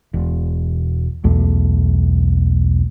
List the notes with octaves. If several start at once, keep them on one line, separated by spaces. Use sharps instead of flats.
E1
B1 E2 A3